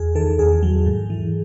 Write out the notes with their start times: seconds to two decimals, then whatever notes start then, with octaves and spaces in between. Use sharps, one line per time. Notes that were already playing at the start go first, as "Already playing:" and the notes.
Already playing: E2 G#4
0.15 D#3 A4
0.39 E2 G#4
0.63 F#3
0.86 G#2
1.10 E3